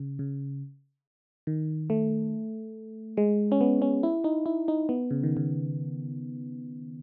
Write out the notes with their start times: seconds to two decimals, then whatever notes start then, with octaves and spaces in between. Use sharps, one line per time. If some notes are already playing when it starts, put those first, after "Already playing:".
Already playing: C#3
0.19 C#3
1.47 D#3
1.90 A3
3.17 G#3
3.52 C#4
3.61 B3
3.82 C#4
4.03 E4
4.24 D#4
4.46 E4
4.68 D#4
4.89 B3
5.11 C#3
5.23 D#3
5.37 C#3